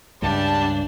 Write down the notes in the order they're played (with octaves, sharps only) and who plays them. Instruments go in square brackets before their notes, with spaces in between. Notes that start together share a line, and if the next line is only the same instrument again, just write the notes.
[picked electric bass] C#2 G2 [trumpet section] G3 G4 A5 [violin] D4